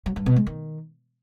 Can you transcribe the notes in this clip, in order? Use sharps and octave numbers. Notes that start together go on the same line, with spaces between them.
F#3
G2
B2
G#3
D#3